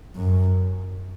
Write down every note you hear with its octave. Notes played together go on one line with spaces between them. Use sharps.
F#2